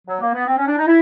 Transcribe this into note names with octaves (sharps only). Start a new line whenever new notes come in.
F#3
A#3
B3
C4
C#4
D4
D#4
E4